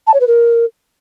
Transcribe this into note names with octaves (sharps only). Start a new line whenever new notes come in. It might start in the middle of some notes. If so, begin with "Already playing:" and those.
A5
C#5
B4
A#4